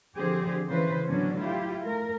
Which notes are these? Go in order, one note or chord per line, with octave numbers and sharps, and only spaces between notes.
D3 F3 C4 G4 G#4 C5
C#3 E3 B4 C5
A2 D3 F#3 B3 C#4 D4
E4 F4 G4
A3 A#4